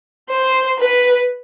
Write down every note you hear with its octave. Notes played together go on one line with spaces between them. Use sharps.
C5
B4